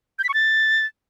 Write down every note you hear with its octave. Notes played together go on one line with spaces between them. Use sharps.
G6
B6
C#6
A6